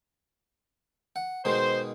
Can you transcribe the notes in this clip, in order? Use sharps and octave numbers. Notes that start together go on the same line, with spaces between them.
F#5
B2 D#3 G#3 C5